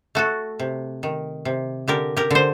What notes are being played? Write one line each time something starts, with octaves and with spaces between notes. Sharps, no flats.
A3 F#4 A4
C3
D#3
C3
D3 G4 A#4
G4 A#4
D3 C5